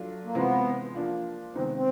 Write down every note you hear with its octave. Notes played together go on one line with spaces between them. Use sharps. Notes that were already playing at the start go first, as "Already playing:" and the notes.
Already playing: F#3 A3 D4 F4
A#3
C3 E3 G#3 B3 C4 F4
F3 A#3 D4 F4
C3 D#3 G#3 B3 C4 D#4
C4